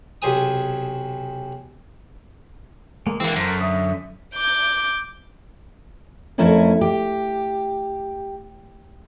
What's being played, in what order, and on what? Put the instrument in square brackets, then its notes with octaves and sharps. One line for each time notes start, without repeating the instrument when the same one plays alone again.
[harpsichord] B1 C3 G#4 C5 G#5 D#6
[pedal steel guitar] G#3 A#3
[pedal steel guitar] E3 F#5 [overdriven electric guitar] A#3 C4
[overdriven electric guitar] F#2 [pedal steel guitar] A4 A#4 C5
[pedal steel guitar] D3 E5 D#6
[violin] D6 G6
[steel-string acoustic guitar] F2 A3 C#4 E4 A#4
G4